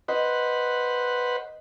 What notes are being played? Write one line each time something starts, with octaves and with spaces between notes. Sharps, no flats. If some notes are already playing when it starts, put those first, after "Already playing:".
B4 C5 D#5 F#5